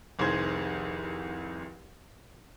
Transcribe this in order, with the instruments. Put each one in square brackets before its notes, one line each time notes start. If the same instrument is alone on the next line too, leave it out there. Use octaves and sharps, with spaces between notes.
[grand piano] F1 C2 D#3 G#4 C5 G#6